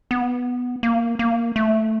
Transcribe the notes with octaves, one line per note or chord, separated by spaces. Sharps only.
B3
A#3
A#3
A3